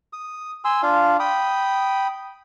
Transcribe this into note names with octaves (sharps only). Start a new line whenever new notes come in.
D#6
G#5 C6 E6
D4 F4 F5
G5 B5 D#6